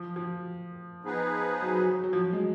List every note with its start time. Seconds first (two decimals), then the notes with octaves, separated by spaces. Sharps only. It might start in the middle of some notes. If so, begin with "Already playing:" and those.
Already playing: F3
0.16 F3
1.04 F3 B3 D#4 G#4 B4
1.62 F#3
1.76 F#3
1.90 F#3
2.04 F#3
2.13 F3
2.18 F#3
2.33 G#3